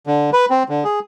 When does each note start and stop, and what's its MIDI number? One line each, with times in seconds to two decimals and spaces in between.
0.07 0.30 50
0.33 0.45 71
0.50 0.63 60
0.69 0.84 50
0.84 0.99 68